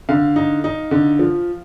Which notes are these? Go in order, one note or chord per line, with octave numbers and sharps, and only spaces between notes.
D3 F5
D#4
D#4
D3
F3